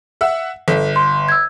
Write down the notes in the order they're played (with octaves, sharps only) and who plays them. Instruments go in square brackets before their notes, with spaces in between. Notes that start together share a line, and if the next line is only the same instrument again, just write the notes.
[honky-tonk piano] E5 F#5 E6
[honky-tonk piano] G1 B6 [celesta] A4
[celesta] C6
E6 G#6